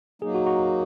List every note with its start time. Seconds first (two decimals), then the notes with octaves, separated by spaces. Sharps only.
0.22 F#3 A#3 D#4 G#4
0.35 F#4
0.46 F#4